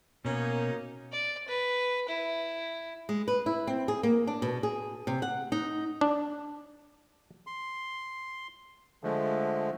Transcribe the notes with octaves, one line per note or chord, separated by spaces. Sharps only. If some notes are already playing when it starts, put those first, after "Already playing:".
B2 A#3 C#4 D#4
D5
B4
E4
G#3
B4
E4
C4
G#4
A#3
D4
B2
G#4
C3
F#5
D#4
D4
C6
D3 F3 G#3 A3